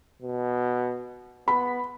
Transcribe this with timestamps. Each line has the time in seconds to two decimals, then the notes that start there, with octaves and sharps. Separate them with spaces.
0.22 B2
1.48 B3 B5